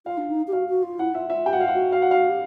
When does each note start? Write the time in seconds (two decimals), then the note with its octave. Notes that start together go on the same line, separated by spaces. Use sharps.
0.06 F4 F5
0.18 D4
0.30 D#4
0.47 G4
0.52 F#4 F5
0.68 F#4
0.83 F4
0.99 E4 F#5
1.15 F4 E5
1.30 F4 E5
1.46 G4 G5
1.53 F#5
1.55 F#4
1.60 F5
1.65 F4 F#5
1.74 F#4
1.92 F5
2.02 F#5
2.11 F5
2.29 G4